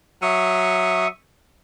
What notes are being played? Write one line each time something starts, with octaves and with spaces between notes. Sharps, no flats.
F#3 E5 C#6 D#6